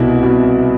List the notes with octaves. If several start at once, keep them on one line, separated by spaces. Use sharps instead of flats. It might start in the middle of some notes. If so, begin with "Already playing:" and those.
Already playing: C2 B2 E4
B2